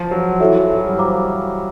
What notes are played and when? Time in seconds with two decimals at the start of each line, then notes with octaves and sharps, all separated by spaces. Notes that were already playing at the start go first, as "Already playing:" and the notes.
Already playing: F3
0.11 F#3
0.40 E3 F#4 A4 C#5 E5
0.69 F#3
0.84 G3
0.98 C5 F5 A#5 D6